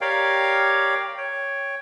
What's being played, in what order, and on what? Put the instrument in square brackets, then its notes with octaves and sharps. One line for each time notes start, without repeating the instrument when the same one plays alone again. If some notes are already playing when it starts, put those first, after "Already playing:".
[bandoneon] G4 A#4 C#5 D5 F5 G5
C#5 G5